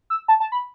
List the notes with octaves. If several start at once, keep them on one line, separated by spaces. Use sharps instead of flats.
E6
A5
A5
B5